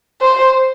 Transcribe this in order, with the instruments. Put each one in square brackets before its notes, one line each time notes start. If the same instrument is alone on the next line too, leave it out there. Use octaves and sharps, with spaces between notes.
[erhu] C5